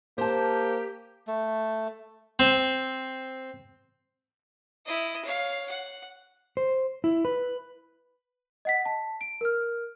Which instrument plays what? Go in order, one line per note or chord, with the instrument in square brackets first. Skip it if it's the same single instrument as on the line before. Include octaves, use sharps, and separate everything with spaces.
[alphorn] A#3 [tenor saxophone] G4 [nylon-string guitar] C5 A5
[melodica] A3
[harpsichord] C4
[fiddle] E4 D#5
C#5 F5
F#5
[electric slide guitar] C5
E4
B4
[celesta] D#5 F#5 B6
A5
D7
A#4 F6